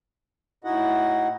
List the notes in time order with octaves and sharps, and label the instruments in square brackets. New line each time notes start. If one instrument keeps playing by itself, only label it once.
[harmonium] A2 D#4 E4 F#4 D#5 F#5